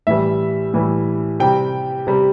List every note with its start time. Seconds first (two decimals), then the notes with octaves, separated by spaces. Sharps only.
0.07 A2 E3 G3 E5
0.74 A2 E3 G3
1.40 C3 G3 G5
2.07 C3 G3